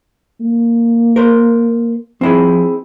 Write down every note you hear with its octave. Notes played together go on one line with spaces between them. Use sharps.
A#3
A#4 C5
F3 C4 E4 G#4